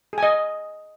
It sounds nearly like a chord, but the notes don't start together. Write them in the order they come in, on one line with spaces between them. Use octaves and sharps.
G#4 G#5 D#5